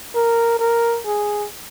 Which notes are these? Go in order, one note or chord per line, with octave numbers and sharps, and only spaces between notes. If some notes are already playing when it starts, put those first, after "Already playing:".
A#4
A#4
G#4